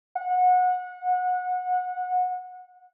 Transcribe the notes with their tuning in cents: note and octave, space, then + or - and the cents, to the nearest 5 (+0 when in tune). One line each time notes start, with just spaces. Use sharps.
F#5 -25